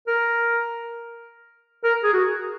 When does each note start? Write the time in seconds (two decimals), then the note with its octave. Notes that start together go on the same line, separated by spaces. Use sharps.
0.08 A#4
1.84 A#4
2.03 G#4
2.13 F#4